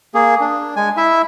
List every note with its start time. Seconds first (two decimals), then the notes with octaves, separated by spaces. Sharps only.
0.15 A#3 G#4
0.40 D4
0.76 G#3 G#5
0.97 E4 E5